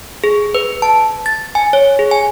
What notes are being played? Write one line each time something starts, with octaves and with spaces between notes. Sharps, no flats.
G#4
B4
A5
A6
G#5
C#5
G#4
G#5